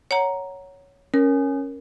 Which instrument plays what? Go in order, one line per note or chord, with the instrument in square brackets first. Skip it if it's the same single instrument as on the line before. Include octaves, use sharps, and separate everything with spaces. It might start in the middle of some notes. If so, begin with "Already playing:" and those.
[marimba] C#5 F#5 A#5
[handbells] C#4 [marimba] A#4